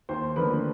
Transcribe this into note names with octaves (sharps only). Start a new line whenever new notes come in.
D#2 C5
D3 F3 A#3 B4